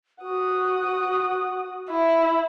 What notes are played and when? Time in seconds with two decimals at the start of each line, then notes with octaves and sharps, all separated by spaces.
0.22 F#4 F#5 D#6
1.90 E4